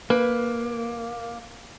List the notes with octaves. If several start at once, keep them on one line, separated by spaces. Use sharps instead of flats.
A#3 B4